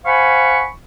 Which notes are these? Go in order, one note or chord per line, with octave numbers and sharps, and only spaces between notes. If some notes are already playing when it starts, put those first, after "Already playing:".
C5 F5 F#5 G#5 B5 C#6